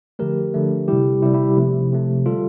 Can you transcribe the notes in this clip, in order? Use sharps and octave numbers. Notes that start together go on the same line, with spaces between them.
D3 F3 A3 G4 A#4
D3 F3 A3
C3 G3 E4 G4
C3 G3 E4 G4
E4 G4
C3 F3 A3
C3 F3 A3
D3 G3 F4 A4